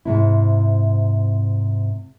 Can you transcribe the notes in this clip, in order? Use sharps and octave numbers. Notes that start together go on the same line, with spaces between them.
G#2 C3 E4